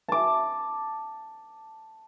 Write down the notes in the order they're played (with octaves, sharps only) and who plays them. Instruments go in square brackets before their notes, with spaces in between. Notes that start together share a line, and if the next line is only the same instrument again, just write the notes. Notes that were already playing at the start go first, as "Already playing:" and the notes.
[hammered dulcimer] A5 D6